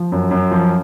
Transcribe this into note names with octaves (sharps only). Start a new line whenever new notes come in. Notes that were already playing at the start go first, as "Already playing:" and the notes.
Already playing: F3
F#2
F#2
F3